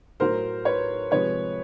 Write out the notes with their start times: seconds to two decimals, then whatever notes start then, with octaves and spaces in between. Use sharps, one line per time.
0.20 A2 F#3 A#4 C5
0.65 B4 C#5
1.11 C3 F3 G#3 B4 C#5